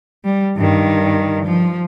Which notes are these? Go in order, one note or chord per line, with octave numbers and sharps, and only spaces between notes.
G3
G2 D#3
F3